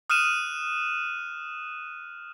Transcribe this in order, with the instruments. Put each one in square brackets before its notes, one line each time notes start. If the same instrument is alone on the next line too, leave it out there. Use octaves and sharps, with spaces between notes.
[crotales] D#6 F6 F#6 D#7 E7